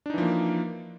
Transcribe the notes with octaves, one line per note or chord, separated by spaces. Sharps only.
E3 F3 A#3 D4 D#4